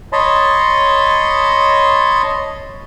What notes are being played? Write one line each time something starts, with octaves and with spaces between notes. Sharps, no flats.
C#5 D#5 A5 B5 C6